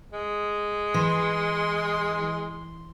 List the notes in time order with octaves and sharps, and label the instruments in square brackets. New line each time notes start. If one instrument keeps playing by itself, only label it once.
[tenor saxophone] G#3
[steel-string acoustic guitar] E3 [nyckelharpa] C6